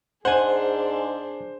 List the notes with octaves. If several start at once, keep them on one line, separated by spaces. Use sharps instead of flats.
G#2 D4 G#4 C5 F#5 G#5